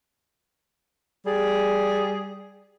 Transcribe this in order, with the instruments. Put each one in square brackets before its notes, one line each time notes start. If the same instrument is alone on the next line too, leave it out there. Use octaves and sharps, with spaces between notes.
[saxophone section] G3 G#4